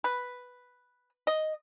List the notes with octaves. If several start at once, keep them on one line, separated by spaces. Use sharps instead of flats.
B4
D#5